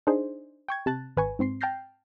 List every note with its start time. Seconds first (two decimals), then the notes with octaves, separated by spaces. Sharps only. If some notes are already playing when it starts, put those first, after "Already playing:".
0.07 D4 D#4 G#4 C5
0.68 G5 C#6 G#6
0.86 C3 A5 F#6 A6
1.17 G#1 B4 G#5 C#6
1.39 G#2 C4 C6 C7
1.61 G5 A5 F6 G6 A#6 C7